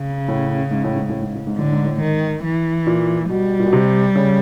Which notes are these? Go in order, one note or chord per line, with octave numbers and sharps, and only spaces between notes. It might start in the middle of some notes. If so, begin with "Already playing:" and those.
Already playing: C#3
A2
G#2
A2
G#2
A2
G#2
A2
G#2
A2 D3
G#2
A2
G#2 D#3
E3
A#2
B2 G3
A#2
B2
C3
C#3